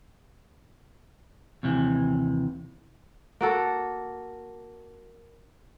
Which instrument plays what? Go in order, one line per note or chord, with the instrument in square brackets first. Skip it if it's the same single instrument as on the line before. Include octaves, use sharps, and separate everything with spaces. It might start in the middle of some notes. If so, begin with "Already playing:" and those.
[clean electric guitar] D#2 C3 E3
[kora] A#3 F#4 A4